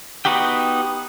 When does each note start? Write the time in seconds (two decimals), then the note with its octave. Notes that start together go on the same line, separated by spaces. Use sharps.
0.25 B3 D#4 F#4 G4 G5